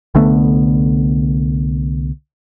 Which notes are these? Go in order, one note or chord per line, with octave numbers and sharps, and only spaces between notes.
C2 D3 A3 B3